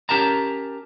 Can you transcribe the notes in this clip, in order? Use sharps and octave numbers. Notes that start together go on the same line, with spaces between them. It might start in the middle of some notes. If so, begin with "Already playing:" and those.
C#4 G4 A#4 A5 A#5